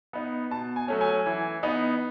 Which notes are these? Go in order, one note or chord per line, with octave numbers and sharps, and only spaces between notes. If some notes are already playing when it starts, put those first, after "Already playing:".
B3 D#4
B2 A5
G#5
F#3 A3 C#4
G#5
E3
B3 D#4